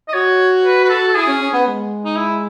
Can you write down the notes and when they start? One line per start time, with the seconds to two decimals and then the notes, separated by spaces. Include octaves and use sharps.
0.08 D#5
0.13 F#4 C#5
0.65 B4
0.84 B4
0.89 A4
1.08 A4
1.15 E4 G#4
1.28 C#4
1.41 C#4
1.53 B3
1.66 G#3
2.05 D#4
2.17 E4